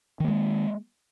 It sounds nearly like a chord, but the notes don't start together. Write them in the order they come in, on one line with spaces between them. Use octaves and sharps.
D#3 A#3 G#3